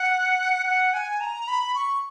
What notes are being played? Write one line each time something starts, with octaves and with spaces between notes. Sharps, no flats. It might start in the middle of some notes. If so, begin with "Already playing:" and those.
Already playing: F#5
F#5
G#5
A#5
B5
C#6